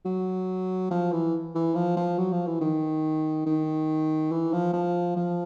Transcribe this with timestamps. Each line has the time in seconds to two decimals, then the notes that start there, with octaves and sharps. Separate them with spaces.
0.05 F#3
0.90 F3
1.12 E3
1.55 E3
1.75 F3
1.96 F3
2.18 F#3
2.32 F3
2.47 E3
2.61 D#3
3.46 D#3
4.31 E3
4.53 F3
4.73 F3
5.16 F3